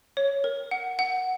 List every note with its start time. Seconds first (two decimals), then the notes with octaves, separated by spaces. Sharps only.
0.17 C#5
0.44 A#4
0.71 F#5
0.99 F#5